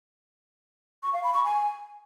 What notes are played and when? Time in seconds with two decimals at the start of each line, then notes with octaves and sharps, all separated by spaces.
1.03 C#6
1.13 F5
1.24 B5
1.34 C#6
1.44 G#5